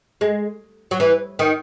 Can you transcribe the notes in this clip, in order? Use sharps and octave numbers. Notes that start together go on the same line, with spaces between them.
G#3
F#3
E3
D#3